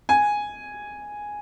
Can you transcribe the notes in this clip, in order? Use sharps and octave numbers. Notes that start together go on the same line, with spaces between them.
G#5